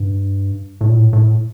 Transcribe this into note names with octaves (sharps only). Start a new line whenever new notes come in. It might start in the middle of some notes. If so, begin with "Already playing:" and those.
Already playing: G2
A2
A#2
A2
A2